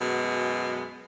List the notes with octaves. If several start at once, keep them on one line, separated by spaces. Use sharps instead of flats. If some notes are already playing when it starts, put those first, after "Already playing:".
F#2 B2 G#3